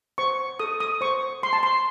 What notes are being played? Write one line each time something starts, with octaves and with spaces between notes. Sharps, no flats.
C5 C#6
A4 D#6
D#6
C5 C#6
C5 C6
A5
C6